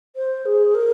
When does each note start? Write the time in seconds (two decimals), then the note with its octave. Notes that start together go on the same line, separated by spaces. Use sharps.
0.16 C5
0.46 G#4
0.75 A#4